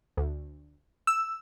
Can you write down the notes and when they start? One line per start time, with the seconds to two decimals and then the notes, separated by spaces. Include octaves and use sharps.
0.17 D2
1.07 E6